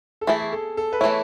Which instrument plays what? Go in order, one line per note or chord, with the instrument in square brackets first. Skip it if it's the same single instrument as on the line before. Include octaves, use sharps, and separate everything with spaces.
[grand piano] A4
[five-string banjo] E3 A3 E4 [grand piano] G#4
[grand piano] G#4
A4
A4
B4
[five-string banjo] E3 A3 E4 [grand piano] C#5